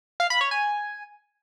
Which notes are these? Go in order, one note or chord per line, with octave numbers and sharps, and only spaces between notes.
F5
B5
C#5
G#5